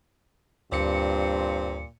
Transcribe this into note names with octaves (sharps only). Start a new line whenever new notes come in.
D2 G2 A#2 C4 C#7